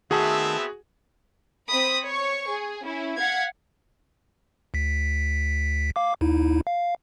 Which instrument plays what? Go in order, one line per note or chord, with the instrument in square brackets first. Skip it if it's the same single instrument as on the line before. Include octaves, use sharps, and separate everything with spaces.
[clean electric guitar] D#3 A3 A4 [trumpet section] B3 C4 E5 [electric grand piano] F#4 G#4
[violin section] C4 B5 D#6 B6
C#5 C#6
G#4
C#4 E4
F5 F#5 G#6 B6
[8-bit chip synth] D2 B6
F5 D6
D#2 D#4 E4
F5